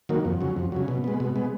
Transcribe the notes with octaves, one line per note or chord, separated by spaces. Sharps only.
D#3 F#3 A#3
F2
C#3 F#3
F2
C#3 F#3
B2
G#3 B3
B2
G#3 B3